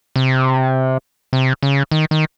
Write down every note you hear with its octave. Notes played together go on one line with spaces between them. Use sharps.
C3
C3
C#3
D#3
D#3